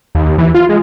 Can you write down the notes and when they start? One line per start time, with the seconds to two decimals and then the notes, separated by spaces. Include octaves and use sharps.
0.15 D#2
0.38 E3
0.54 F4
0.69 G#3